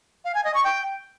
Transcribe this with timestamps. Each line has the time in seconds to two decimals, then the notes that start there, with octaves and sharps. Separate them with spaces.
0.25 F5
0.35 G#5
0.44 D#5
0.54 C#6
0.64 G5